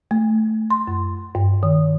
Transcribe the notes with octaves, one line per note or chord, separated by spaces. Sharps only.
A3
C6
F#2
G2
D#3